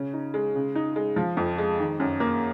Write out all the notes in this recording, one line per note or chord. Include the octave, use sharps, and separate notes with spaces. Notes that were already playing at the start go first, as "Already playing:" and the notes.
Already playing: C#3 C#4
D#4
G#3
C#3
D#4
G#3
F3
F2
G#3
D#3
F#2
A#3